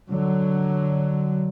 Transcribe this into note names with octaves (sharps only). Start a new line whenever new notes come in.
D3 F#3